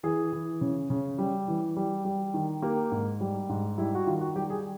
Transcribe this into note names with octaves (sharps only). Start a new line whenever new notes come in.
E3 G#4
E3
C#3
C#3
G3
E3
G3
G3
D#3
A#3 G4
G#2
G3
G#2
G3 E4
F#4
D#3 F4
F#4
G3 G4
G#4